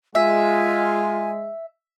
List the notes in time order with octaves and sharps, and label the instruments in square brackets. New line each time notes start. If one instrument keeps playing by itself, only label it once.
[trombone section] G#3 [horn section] F4 [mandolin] E5 [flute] G#5